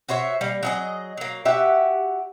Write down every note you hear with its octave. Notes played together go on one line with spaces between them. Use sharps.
F#4 C5 C#5 E5
G3 A#3
F#3 G#4 D#5
F#3 A#3
F#4 G4 E5 F#5